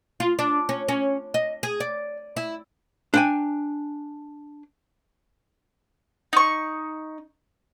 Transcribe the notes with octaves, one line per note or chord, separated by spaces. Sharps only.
F4
D4
C#4
C#4
D#5
G#4
D5
E4
D4 G5 G#5
D#4 C#6